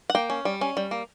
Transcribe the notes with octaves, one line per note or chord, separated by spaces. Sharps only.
F#5
A#3 G5
C#4
G3
C#4
G3
A#3